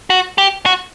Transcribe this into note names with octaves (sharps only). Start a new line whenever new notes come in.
F#4
G4
F#4